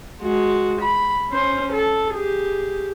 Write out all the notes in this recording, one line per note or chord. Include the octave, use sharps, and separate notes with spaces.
G#3 F#4
B5
C#4 C5
A4
G4 G#4